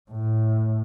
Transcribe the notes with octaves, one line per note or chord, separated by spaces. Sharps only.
A2